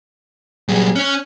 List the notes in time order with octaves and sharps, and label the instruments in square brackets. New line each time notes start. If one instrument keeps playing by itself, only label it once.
[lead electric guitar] A#2 F#3 [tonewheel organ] G3 G#4
[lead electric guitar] C#4 C#5 [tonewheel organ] F#6